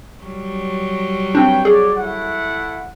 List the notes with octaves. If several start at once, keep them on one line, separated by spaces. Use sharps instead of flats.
F#3 G3
C4 D4 B4 C#5 G5
F#4 G#4 C#5 D5
A3 E4 F#5